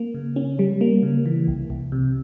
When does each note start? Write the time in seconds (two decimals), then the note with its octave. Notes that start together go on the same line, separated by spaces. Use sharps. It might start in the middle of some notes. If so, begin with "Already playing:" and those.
Already playing: A#3
0.14 C#3
0.36 C#4
0.59 G3
0.81 A#3
1.03 C#3
1.26 E3
1.48 C2
1.70 C2
1.92 C3